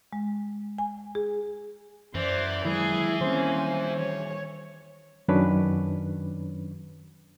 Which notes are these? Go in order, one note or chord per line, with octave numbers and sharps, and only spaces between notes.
G#3
G#5
G#4
F#2 E3 C5 D5
D#3 F#3 G#3 E4 G#4
D#3 G3 A#3 C4 C#4 C5
C#5
F#2 D#3 F#3 C#4 D4 B4